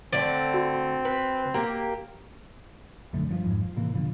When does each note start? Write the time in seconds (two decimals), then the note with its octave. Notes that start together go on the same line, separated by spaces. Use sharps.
0.13 D3 A3 C4 D5
0.54 F#4
1.05 B4
1.54 A#3 G4
3.13 B1 F#2 D3 A3
3.29 G2 D3 F3
3.44 G#1 F2 G#2
3.61 F3
3.76 A2 C3 E3 A#3
3.95 F2 B2 D3 F3